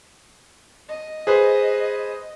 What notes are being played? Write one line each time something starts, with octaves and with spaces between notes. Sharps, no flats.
D#5
G#4 B4 C5